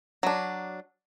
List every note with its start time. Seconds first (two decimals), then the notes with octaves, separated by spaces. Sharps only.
0.23 F#3 D4